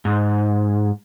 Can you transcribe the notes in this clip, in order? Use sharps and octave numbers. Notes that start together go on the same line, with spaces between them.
G#2